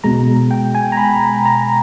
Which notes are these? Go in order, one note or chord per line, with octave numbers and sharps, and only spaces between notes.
B2 G#3 A#5
G5
G#5
A#5
B5
A#5